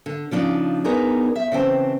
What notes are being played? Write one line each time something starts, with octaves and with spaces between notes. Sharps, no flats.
D3
C#3 F3 D4 D#4
B3 D4 D#4 G#4 A#4
E5
C#3 E3 C4 A5